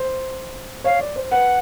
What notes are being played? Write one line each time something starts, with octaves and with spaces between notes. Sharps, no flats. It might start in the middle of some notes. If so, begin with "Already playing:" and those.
Already playing: C5
C#5 F5
D5
C5
B4 F#5